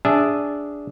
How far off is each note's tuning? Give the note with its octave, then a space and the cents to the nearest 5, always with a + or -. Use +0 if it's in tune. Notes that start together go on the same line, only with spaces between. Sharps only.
D4 -10 G#4 -10 E5 +0